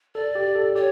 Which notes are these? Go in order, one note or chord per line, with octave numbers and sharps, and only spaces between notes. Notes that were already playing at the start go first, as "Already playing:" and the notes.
A4 D5
G4
A4
G4 C#5